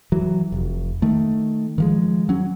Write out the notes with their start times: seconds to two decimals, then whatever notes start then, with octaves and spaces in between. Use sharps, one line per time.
0.12 E3 F#3
0.52 F1
1.02 D#3 A3
1.78 D#3 F3 G#3
2.29 F#3 C#4